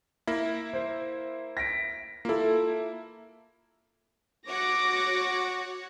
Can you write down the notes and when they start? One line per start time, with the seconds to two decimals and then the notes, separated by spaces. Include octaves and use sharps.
0.27 A#3 E4 A#6
0.73 C5
1.57 A#6 B6 D7
2.25 A#3 E4 F4 A4
4.49 F#4 C#5 D6 A#6